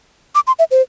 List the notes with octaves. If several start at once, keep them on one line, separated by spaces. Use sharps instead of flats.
D6
C6
E5
C5